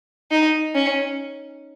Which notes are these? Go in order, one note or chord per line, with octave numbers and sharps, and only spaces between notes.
D#4
C#4